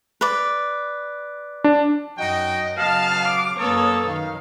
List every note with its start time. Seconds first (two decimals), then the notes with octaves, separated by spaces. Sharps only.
0.21 B4 D5
1.64 D4
2.18 F#2 D#4 F#4 D#5 G5
2.78 C#3 F#3 B3 F5 A5
3.28 D6
3.59 F#2 A#3 A4 B4 C#5 D#6
4.06 D#3 F5